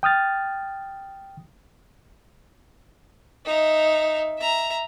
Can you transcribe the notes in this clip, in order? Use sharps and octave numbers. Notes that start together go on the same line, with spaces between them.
G5 D#6 F6 A6
D#4 E5
E5 A#5